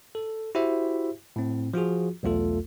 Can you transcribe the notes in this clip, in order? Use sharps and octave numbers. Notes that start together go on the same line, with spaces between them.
A4
E4 F#4 G4 C5 E5
A2 C4
F3 F4 F#4 G#4
B1 E2 A3 F4 A4